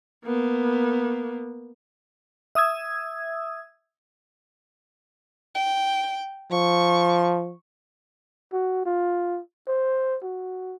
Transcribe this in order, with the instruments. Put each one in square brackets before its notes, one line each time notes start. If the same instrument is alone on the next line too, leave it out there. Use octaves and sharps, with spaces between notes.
[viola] A#3 B3
[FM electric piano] E5 D#6 E6 G#6
[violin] G5
[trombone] F3 [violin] C#6
[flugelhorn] F#4
F4
C5
F#4